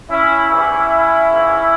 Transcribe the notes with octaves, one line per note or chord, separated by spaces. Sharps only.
C#4 E4
G#2 E3 G3 B3 C#4 E4
G#2 E3 A#3